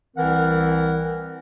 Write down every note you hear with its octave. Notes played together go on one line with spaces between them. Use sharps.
C2 E3 C4 A#4 F#5